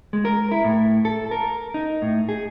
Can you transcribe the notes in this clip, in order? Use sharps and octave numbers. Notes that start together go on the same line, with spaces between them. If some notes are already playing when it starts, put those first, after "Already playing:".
G#3
A#4
E4
A2
A4
A#4
D#4
A2
G#4